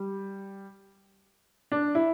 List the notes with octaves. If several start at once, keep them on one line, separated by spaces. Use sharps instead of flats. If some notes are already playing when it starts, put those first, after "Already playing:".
Already playing: G3
D4
E4